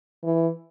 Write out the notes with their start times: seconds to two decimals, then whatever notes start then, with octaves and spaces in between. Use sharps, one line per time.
0.24 E3